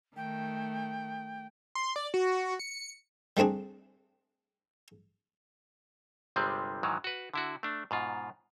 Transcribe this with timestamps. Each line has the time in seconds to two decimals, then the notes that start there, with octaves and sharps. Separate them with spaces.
0.16 D#3 A3 G5
1.75 C6
1.96 D5
2.14 F#4
2.59 C#7
3.37 G3 A3 C4 D4 G#4
6.36 G1 C3 G3 G#3 C4
6.83 G#2 D#3 E3 F#3
7.04 F#4 B4
7.34 D3 E4 F#4
7.63 A3 D4
7.91 G#2 B2 F4